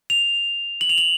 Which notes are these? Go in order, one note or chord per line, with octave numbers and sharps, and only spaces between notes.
F7
F#7
F7
F#7